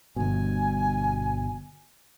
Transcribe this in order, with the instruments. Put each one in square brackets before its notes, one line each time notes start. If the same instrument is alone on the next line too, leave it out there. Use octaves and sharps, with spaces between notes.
[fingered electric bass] G1 G2 B2 [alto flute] G#5